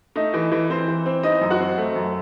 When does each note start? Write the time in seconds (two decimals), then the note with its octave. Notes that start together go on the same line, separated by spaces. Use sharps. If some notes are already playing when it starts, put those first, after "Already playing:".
0.16 A3 D#4 D#5
0.34 E3
0.52 E3
0.69 E3 C4 C5
0.88 E3
1.06 C4
1.23 E3 D#4 D#5
1.41 F#2
1.50 F#4 F#5
1.59 C4
1.78 A3
1.96 F#2